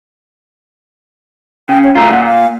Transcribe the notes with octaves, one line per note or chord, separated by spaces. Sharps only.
C#3 G5
C#5
D2 A3 F4 A#5
A#2 F#5
F5